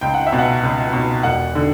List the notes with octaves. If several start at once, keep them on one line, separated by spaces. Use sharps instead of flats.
C#2 G5
F#5
E5
B2
F#5
C#2
B2
E1 F#5
D3